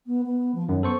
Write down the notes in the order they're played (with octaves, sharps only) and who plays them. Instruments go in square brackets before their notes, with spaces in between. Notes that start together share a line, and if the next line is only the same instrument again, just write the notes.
[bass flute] B3
B3
F3
[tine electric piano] F#2 [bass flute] D#3
[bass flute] B3 [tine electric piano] A4 C5 C#6